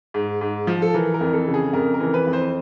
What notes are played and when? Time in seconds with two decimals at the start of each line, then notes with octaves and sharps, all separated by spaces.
0.14 G#2
0.41 G#2
0.67 F3
0.82 A4
0.94 E3 A#4
1.14 A#4
1.21 F2
1.33 A4
1.48 C#3
1.54 G#4
1.73 F2 A#4
1.94 A#4
2.00 E3
2.14 B4
2.27 F2
2.33 C5